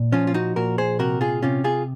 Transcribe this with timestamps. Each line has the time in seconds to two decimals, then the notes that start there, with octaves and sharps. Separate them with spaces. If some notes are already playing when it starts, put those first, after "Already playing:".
Already playing: A#2
0.12 F3 C#4 F4
0.27 F4
0.34 D#4 F#4
0.56 A#2 F#4 A#4
0.78 G#4 C5
0.99 C3 F#4 A#4
1.21 F4 G#4
1.42 C3 C#4 F4
1.64 F4 G#4